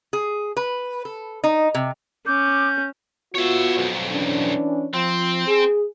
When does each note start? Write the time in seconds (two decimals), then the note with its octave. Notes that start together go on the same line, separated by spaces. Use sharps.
0.13 G#4
0.57 B4
1.05 A4
1.44 D#4
1.75 C3
2.27 C#4 D6 G6
3.35 B3 F4 F#4 C#5 E5
3.77 B1 F2
4.12 E3 C#4 D4
4.94 F3 C4
5.48 G#4